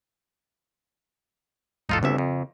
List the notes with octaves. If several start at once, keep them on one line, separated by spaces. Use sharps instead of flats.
D#1 A1 G#2 D#4 F4 A4
G1 D2 C#3 C4 E5
F2